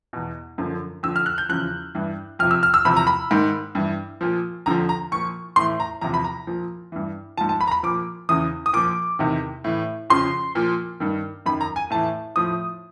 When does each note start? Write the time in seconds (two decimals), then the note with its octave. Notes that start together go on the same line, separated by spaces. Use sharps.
0.13 E2 B2
0.58 F#2 D3 F3
1.03 F2 D3 F3 E6
1.16 F6
1.26 F#6
1.38 G6
1.49 E2 C#3 F3 F#6
1.95 G2 E3
2.39 F2 F6
2.42 C3 F3
2.51 E6
2.63 F6
2.74 E6
2.85 E2 C3 F3 B5
2.96 A#5
3.07 B5
3.31 G#2 D#3
3.75 G2 E3
4.21 A#2 F3
4.66 F2 D3 F3 A#5
4.89 A#5
5.12 A#2 F3 C#6
5.56 A2 E3 C6
5.80 A#5
6.01 E2 C3 F3 A#5
6.14 B5
6.24 A#5
6.47 A#2 F3
6.92 G2 E3
7.37 G#2 F3 A5
7.49 A5
7.61 B5
7.67 A#5
7.71 B5
7.83 A#2 F3 D6
8.29 E2 C#3 E3 D#6
8.66 D#6
8.73 A#2 F3 D6
9.19 E2 C3 D#3
9.64 A2 E3
10.10 F2 C#3 F3 C6
10.55 A#2 F3
11.00 G2 D#3
11.46 F#2 D#3 B5
11.61 A#5
11.76 G#5
11.90 A2 E3 A5
12.36 A2 F3 D#6